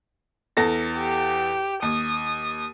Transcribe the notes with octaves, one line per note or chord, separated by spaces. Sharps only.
E2 A4 A#6
G4
D#2 D#6